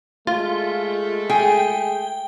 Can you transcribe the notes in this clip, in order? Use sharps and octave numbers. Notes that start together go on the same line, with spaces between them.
G#3 A3 F4
G#4 G5